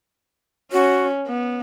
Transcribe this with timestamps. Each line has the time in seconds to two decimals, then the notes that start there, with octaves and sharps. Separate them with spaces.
0.72 C#4 F#4
1.27 B3